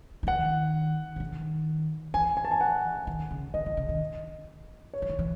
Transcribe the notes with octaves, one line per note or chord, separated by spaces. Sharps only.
E3
D#3 F#5
C#3
D#3
E3 G#5
G#5
A5
G#5
F#5
D#3
C#3
D#3 D#5
E3
C#3
D#3
C#5
E3
D#3
E3